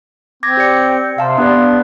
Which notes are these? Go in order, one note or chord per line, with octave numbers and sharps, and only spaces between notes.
C4 D6 G#6 A#6
G4 D5 C#7
C3 F5 A5 C6
B3 D4 G4 D5